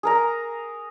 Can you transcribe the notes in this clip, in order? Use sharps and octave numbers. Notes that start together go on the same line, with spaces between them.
G#4 A#4 A#5